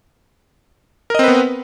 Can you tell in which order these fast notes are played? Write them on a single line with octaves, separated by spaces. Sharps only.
A#4 D#5 C4 B4 B3